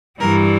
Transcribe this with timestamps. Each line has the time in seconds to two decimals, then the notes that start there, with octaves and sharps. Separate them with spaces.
0.19 G2 E3 G3 A#4